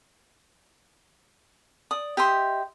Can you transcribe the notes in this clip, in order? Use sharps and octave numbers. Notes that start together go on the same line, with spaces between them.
D5 D#6
G4 D#5 E5 C6